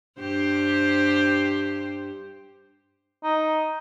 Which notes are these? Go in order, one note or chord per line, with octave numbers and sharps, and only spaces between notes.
G2 G4 C5
D#4